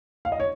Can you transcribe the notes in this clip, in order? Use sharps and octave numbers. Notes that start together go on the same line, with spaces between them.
F5
D#5
C#5